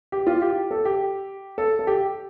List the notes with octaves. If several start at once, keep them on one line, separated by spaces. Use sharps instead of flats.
G4
F4
G4
A4
G4
A4
A4
G4